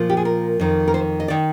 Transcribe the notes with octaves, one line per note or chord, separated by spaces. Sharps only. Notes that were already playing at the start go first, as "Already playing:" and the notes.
Already playing: A#2 F3
G4
G#4
A#4
F2 D#3
A#4
C5
D#5
D#3 D5